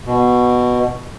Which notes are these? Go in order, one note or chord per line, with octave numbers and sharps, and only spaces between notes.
B2